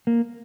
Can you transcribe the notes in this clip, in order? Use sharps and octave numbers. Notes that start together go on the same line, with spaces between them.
A#3